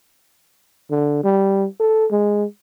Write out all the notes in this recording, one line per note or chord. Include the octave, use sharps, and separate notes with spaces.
D3
G3
A4
G#3